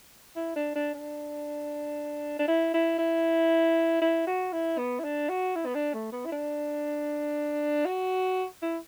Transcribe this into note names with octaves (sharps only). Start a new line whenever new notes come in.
E4
D4
D4
D4
D4
E4
E4
E4
E4
F#4
E4
B3
E4
D4
F#4
E4
B3
D4
A3
B3
E4
D4
F#4
E4